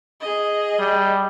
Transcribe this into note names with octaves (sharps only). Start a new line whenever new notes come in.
G#4 D#5
G3